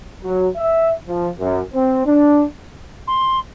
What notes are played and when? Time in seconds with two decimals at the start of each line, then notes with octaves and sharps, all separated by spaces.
0.23 F#3
0.57 E5
1.07 F3
1.39 F#2
1.73 C4
2.06 D4
3.07 C6